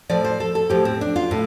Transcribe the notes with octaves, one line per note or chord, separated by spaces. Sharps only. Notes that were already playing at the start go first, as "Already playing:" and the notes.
A2 F3 D5
C5
A4
A4
A2 F3 G4
C4
D4
F4
A2